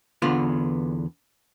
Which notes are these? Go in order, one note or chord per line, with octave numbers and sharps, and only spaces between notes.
E2 D3 B3 F4